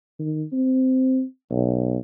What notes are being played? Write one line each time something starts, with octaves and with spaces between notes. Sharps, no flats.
D#3
C4
B1